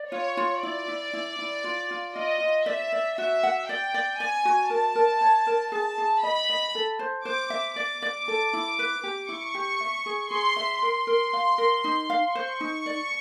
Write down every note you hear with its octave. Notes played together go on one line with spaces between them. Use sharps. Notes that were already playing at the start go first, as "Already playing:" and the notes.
Already playing: D5
F4 C#5
F4
E4 D5
E4
E4
E4
F4
F4
F4 D#5
F4
D5 E5
D5
F#4 E5
F#5
D5 G5
D5
D5 G#5
F#4
A#4 A5
A#4
C#5
A#4
G#4 A5
G#4
D#5 B5
D#5
A4
C5
C5 D6
E5
D5 D6
D5
A4
E4
B4
G4
E4 C#6
G4
E5
G#4
G#4 C6
E5
A#4 C6
A#4
F5
A#4
D#4
F5
C5 C#6
D#4
D5